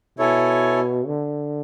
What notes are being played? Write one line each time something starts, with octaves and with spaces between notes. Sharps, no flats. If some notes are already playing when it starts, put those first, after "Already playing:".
B2 E4 A4 C#5 G#5
D3